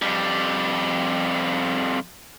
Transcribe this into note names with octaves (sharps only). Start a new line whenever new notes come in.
F2 G3